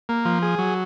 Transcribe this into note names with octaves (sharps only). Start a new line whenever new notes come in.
A#3
F3
G#4
F#3